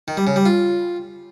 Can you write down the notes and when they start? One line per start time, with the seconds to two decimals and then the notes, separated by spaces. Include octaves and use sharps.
0.08 D#3
0.17 G3
0.27 C#3
0.36 G3
0.46 F4